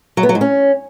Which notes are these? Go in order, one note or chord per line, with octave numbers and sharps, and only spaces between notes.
F#3
B3
F#3
G#2
C#4